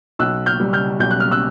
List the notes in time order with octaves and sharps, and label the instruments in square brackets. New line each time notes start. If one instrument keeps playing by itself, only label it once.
[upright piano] B1 E6 F#6
F6 G6
G3
F6 G6
B1 G6
F#6
F6
E6 F#6